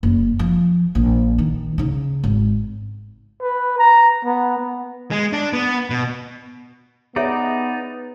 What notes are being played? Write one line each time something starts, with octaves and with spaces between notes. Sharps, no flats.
F#1
F3
A#1
D#3
C#3 D#4
G#1
B4
A#5
B3
B3
G#3
D4
B3
B2
B3 D#4 G#4 C#5 D5 E5